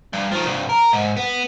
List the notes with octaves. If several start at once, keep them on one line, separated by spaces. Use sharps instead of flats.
G2
D#3 F3
C2 G2
A#4
G#2
B3